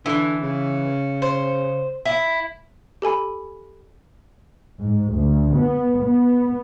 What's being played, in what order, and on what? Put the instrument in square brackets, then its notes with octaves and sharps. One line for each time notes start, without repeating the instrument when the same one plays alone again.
[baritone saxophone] D3 [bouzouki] E3
[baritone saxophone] C#3
[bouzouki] C5
E4
[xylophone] G4 A4 G#5 B5
[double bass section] G#2
D2
B3
B3